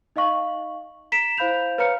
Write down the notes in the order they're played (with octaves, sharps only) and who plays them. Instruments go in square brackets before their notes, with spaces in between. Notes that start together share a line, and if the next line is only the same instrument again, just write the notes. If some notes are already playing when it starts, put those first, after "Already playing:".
[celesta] D#4 D#5 F5 C#6 F#7
A#5 B6 D7 E7
E4 C5 F5 B5 G6 F7
B4 C#5 F5 A#5 F6 C#7